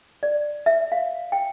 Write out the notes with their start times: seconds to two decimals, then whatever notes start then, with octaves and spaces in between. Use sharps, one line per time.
0.23 D5
0.66 E5
0.92 F5
1.32 G5